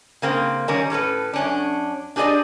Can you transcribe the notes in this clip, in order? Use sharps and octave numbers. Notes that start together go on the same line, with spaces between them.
C#3 A#3 C4
D#3 G3 C#4 A#4
A2 C#4 A4 B4
F#2 C#4 D4
D4 G4 G#4 A#4 D5 D#5